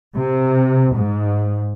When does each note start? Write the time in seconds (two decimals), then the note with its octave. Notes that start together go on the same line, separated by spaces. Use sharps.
0.15 C3
0.96 G#2